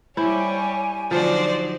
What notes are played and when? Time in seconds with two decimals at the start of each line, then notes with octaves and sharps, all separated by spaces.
0.17 G3 E4 G4 C5 C#5 G#5
1.11 D3 F3 F#3 D#4 C5 D5